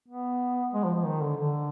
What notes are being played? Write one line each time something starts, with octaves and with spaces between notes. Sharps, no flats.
B3
G#3
F3
F3
D#3
D3
D3